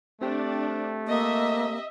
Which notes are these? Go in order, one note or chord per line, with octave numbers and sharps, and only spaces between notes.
A3 C4 D4 G4
A#3 D#5 E5